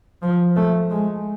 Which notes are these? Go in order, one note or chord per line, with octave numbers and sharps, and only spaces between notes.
F3
A3
G#3